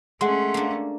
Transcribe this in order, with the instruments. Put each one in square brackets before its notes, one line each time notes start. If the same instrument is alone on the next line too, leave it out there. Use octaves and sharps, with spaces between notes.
[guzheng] G#3 [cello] A3 C#4 [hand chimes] F#5 C6
[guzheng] A#3 D4